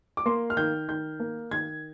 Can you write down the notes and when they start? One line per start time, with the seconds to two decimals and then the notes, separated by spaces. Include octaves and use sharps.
0.17 D6
0.26 A#3 C6
0.50 F6
0.57 D#3 G6
0.88 D#3 G6
1.20 A#3
1.51 D#3 G#6